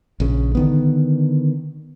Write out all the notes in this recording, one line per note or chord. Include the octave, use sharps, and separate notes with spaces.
A#1 C#3
D3 D#3 B3